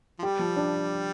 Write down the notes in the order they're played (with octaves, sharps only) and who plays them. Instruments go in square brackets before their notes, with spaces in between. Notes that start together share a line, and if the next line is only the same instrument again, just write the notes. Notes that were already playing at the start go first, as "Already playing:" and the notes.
[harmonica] F3
[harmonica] G3 [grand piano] G4
[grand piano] F3
D4